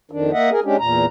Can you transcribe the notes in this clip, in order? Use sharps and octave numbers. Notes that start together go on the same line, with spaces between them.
F2 D#3 D4
A#3 D#5 E5 F#5
G#4 A#4
G#3 C#4 D4 G4
E2 A#2 A#5